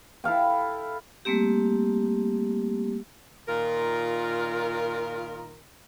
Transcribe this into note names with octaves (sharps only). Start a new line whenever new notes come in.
E4 A4 F5 G5
G3 A3 A#3 C4 G4
A#2 D#3 F4 A#4